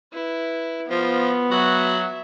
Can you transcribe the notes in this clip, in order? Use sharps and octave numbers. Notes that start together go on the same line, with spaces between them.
E4 B4
F3 B3 F4
F#3 F#4 E5